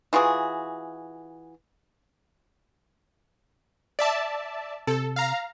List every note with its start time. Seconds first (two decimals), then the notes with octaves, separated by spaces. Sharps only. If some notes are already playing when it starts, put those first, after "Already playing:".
0.13 E3 F4 F#4 G#4
3.99 D5 E5 A5
4.87 C3 A4
5.16 F5 A#5